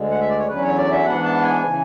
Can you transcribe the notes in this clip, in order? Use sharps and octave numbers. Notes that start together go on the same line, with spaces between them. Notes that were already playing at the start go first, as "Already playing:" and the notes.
Already playing: D2 D3 G#3
F#5
E5
D5
C#5
E2 D3 F#3 C#4 B4
C#5
D5
E5
G#2 E3 B3 D4 F#5
A5
G#5
C#3 E3